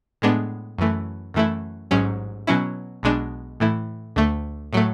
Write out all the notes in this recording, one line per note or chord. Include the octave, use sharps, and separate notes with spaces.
A2 G#3 B3 D4
F#2 E3 A3
F#2 E3 A3 E4
A1 G#2 F#3 C#4
B2 F#3 C#4 E4
B1 B2 G#3 D4
A2 E3 A3 E4
D2 D3 A3
A2 F#3 A3